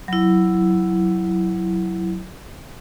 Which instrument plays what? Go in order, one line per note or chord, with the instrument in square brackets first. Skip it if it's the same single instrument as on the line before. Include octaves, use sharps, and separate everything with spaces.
[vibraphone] F#3 E4